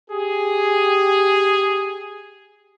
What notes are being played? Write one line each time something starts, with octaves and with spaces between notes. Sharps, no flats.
G4 G#4